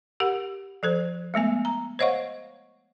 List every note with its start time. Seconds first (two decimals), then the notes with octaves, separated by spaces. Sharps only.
0.20 G4 A#4 F#5
0.83 F3 A4 C5
1.34 G#3 A3 B3 G#5
1.65 A#5
1.99 C5 C#5 D#5 F5 F#5 C#6